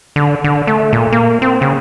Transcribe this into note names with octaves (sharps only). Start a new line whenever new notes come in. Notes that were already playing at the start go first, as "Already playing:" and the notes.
D3
D3
A3
A#2
A#3
C4
C#3